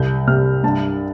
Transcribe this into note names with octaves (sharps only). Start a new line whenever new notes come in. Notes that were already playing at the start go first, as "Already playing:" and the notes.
Already playing: C2 G6
C3 F6
G2 A5